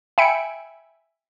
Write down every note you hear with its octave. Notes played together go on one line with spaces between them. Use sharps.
E5 G5 G#5 B5 C#7 D7